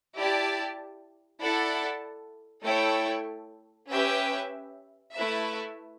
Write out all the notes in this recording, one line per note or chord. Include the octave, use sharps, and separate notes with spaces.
E4 G4 D5 A5
E4 A4 D5 F#5 A5
A3 E4 A4 C#5 G5
C#4 G4 B4 E5 G5
A3 E4 B4 E5